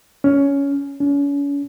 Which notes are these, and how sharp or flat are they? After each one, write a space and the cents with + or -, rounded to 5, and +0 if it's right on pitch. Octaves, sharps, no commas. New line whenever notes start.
C#4 +15
C#4 +40